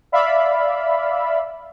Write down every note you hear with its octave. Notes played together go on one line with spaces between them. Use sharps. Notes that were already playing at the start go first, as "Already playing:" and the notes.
D5 E5 F5 B5